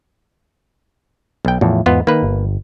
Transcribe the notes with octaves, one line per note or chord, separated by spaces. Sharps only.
B1 G5
E2 A2 F3
E2 G#2 B3 F4
D#3 A#3 B4
G1